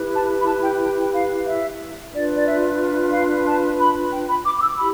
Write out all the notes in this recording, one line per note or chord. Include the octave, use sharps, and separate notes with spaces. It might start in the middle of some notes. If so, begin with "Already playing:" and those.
Already playing: E4 G4 B4
A5
B5
A5
G5
G5
F5
E5
D4 F4 B4 D5
D5
E5
F5
A5
B5
G5
B5
D6
D6
E6
E4 G4 B5